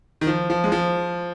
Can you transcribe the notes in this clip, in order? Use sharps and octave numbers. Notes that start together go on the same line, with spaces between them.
D#3
F3
F3
G#3
F3